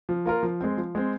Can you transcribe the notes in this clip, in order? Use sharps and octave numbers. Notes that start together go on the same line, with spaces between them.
F3
A#3 F4 A#4
F3
G#3 C4
F3
G#3 C4